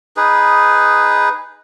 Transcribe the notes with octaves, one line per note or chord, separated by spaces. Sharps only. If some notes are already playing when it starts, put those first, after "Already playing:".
D#4 G#4 B4